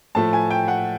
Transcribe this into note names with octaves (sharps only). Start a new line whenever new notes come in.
A2 F3 A3 A5
G#5
G5
F#5